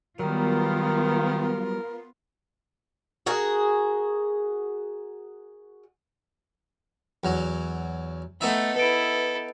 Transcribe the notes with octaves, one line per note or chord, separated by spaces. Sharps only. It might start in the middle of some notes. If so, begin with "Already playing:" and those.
D#3 F#3 G3 B3 F4 A#4
F#4 G#4 A#4
E2 F#3
A3 B3 D#4 E5
E4 A4 B4 D7